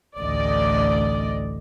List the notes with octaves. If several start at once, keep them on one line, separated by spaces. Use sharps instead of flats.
A1 D2 D5 D#5